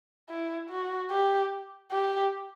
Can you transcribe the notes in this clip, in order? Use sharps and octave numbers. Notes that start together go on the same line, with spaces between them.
E4
F#4
G4
G4